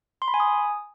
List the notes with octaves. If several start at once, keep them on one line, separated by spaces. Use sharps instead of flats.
C6
B5
G#5
D#6